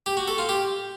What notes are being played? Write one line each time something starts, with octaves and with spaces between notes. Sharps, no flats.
G4
F#4
A4
F4
G4